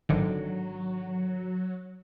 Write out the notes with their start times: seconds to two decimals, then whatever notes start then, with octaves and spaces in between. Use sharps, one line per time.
0.09 G#1 D3 D#3 F#3